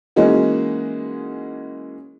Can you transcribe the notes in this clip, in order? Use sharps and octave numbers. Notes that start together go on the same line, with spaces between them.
E3 G#3 A#3 C#4 D#4 F#4